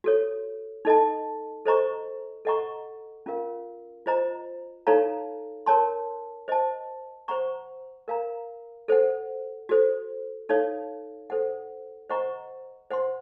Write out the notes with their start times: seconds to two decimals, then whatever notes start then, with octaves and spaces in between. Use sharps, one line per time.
0.04 F#4 A4 C#5
0.85 D#4 A4 D#5 A5
1.65 A4 C5 D#5 A#5 C#6
2.45 A4 D#5 F#5 A#5 C#6
3.26 C#4 F4 A#4 F5
4.06 F4 C5 D#5 A#5
4.87 D#4 A4 C#5 F5 A#5
5.66 A#4 C#5 A5 C6
6.48 C5 D#5 A5
7.28 C5 F#5 A#5 C#6
8.08 A#4 F5 A#5
8.88 A4 C5 F#5
9.69 F#4 A4 C5
10.49 D#4 A4 C#5 F5
11.30 A4 C5 F#5
12.10 C5 D#5 F#5 A#5 C#6
12.91 C5 F#5 C6